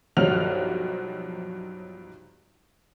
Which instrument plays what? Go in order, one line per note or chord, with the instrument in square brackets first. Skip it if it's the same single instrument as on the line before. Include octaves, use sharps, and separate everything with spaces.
[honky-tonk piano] B1 G2 F3 F#3 F6 F7